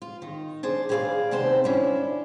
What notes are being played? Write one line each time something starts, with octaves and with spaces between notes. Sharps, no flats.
F4
D#3
D4 G#4 C5
G4 G#4 B4 C5 D5 F5
D#2 C3 B3 C4 C5 A5
C#4 D4 E4